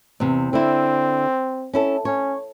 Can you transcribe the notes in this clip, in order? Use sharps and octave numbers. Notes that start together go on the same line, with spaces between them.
E2 C3
D3 C4 E4
C#4 E4 A4
C#4 C#5